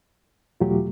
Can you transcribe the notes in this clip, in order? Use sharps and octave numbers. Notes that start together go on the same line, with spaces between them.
E2 B2 F#3 A3 F4 G4